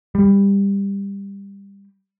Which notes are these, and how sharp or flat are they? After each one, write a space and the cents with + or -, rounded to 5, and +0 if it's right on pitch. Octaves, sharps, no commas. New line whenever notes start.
G3 +20